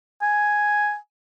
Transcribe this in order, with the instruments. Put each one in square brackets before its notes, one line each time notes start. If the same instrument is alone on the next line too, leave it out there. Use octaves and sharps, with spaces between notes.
[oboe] G#5